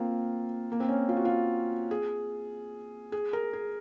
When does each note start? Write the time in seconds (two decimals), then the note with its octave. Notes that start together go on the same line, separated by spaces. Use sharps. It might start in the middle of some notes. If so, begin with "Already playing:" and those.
Already playing: A#3 C4 F4
0.72 A#3
0.80 C4
0.89 C#4
1.09 F4
1.17 F#4
1.25 F4
1.91 G#4
3.12 G#4
3.33 A#4
3.53 G#4